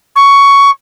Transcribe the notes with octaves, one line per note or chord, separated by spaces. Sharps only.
C#6